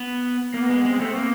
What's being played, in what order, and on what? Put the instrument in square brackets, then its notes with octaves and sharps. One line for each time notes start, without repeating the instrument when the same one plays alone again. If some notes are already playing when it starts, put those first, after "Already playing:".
Already playing: [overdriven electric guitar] B3
[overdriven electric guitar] A#3 [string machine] B3
[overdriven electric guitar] G#3
[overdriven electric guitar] G#3 [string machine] C4
[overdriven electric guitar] A3
A#3